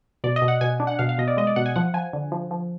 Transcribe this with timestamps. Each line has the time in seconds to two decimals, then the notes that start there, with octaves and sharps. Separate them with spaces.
0.24 B2 D5
0.36 D#5
0.42 B2
0.48 F#5
0.61 B2 G#5
0.80 D4
0.87 F#5
0.99 B2 F5
1.09 F5
1.18 B2 D#5
1.28 D5
1.37 G#3 D#5
1.47 D5
1.56 B2 F#5
1.66 G#5
1.76 F3 F#5
1.94 F3 G#5
2.13 D3
2.32 F3
2.51 F3